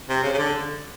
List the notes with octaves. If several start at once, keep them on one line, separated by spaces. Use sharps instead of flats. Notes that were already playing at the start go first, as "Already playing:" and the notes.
C3
C#3
C#3
D3